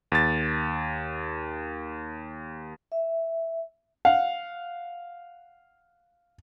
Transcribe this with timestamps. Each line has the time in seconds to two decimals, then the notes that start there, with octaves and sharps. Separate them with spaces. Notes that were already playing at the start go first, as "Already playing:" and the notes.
0.12 D#2 A6
2.92 E5
4.05 F5 F#5